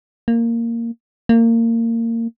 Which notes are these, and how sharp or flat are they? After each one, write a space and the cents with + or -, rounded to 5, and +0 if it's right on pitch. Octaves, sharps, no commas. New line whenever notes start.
A#3 -10
A#3 -25